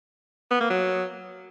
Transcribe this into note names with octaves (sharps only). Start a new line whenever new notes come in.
B3
A#3
F#3